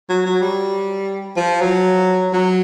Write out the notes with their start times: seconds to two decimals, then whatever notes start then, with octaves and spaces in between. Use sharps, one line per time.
0.10 F#3
0.26 F#3
0.42 G3
1.37 F3
1.61 F#3
2.33 F#3